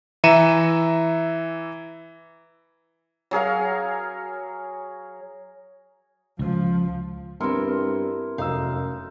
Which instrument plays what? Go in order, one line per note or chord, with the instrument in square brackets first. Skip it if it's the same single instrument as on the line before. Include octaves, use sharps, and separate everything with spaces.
[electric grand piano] E3 E5 A#5 C#7 D#7 E7
[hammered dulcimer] F#3 G#4 A#4 F5
[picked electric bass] C#2 [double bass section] F3
[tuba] G2 [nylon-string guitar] B3 C4 [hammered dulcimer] E4 A#4 C6
[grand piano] F1 E6 [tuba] F#2 [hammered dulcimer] D#4 [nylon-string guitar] F5